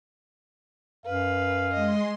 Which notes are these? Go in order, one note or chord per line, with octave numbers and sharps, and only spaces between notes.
F#2 B4 F5
G#3 D#5 C6